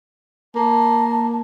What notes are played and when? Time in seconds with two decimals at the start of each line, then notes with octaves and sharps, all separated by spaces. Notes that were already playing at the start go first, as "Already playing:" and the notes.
0.56 A#3 A5